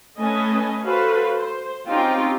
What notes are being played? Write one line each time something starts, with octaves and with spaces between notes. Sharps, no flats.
A3 C#4 B4 D#5 G#5 A5
F#4 A4 B4 C5 F5
C5
C4 C#4 D#4 F4 G4 G5